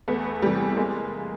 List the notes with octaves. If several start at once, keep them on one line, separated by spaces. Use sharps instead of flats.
E2 A3 B3
C3 E3 G3 A3
G#3 A#3